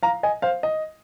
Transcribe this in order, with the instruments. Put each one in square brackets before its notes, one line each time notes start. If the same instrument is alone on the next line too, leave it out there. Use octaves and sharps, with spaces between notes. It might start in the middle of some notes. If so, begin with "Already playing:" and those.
[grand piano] F5 A#5
D#5 G#5
C5 F5
D#5